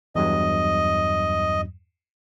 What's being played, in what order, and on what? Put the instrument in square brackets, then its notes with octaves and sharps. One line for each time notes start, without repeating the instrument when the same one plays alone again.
[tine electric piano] E2 G2 F#3 [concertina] D#5